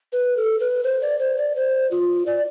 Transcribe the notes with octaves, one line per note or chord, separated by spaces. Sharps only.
B4
A4
B4
C5
D5
C5
D5
C5
F4
D5